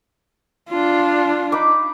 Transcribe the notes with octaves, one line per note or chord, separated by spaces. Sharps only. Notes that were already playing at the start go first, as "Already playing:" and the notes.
D4 F4
D#4 B5 D6